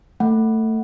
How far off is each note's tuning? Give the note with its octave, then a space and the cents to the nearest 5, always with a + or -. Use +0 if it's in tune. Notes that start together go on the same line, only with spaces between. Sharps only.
A3 +20 F#5 +0